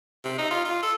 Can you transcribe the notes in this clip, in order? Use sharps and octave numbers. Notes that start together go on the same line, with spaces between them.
C3
D#4
F4
F4
A4